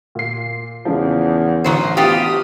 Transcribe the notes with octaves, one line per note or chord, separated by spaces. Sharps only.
A#2 C7
E2 C#3 F3
A1 D2 D#3 F#3 C5
B3 F4 G4 D#6